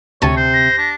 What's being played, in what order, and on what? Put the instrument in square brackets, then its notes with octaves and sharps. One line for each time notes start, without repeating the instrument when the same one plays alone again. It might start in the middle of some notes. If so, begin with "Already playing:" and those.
[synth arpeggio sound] D2 A5 D#7 [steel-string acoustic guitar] C3 [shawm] C#5
[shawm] C5
[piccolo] A#6
[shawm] D4